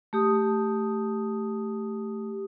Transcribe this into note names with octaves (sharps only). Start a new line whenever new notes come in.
A3 G4 D#6